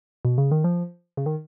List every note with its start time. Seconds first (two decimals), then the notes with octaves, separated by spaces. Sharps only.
0.25 B2
0.38 C#3
0.51 D#3
0.64 F3
1.17 C#3
1.26 D#3